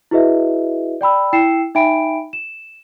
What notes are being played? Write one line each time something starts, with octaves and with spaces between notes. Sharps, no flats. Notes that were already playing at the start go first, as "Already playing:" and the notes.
E4 F#4 G#4 B4 D#5 E5
D5 G5 B5 E6
E4 G5 E6 C7 C#7 E7
D#4 E5 G5 G#5 B5 D7
E7